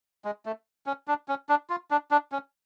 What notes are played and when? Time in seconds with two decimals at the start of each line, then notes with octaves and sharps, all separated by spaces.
0.25 G#3
0.46 A3
0.86 C#4
1.08 D4
1.28 C#4
1.49 D4
1.70 F4
1.91 D4
2.11 D4
2.32 C#4